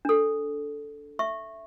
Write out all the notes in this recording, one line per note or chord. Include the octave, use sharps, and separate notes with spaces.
D4 A4
E5 C#6